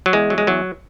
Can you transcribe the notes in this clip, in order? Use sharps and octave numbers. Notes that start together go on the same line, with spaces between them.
F#3
E2 G#3
F#3
G#3
E2 F#3